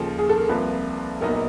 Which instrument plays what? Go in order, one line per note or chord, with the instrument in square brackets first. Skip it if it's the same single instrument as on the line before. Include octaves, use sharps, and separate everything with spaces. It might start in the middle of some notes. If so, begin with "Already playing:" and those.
Already playing: [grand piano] D#2 C#3 F3 [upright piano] A4
[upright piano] G#4
A4
A#4
[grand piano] C2 C3 F3 A#3 [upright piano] B4
[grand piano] A#1 A#2 F#3 B3 D#4 [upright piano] A#4